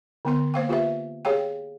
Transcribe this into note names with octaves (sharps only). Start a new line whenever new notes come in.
D3 B3 C6
A#3 C5 F5 G5
F4 G4 B4 E5
G4 G#4 C#5 F5 G5